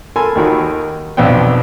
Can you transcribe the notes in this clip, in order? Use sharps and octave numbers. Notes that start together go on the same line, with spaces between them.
A4 A#4 G#5 A5 B5 C6
D#2 D#3 F#4 B5
B1 F2 A#2 B3 D4 G5